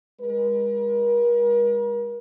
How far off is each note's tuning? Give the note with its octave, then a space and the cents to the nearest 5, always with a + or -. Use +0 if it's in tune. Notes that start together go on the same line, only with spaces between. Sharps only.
G#3 -30 A#4 +40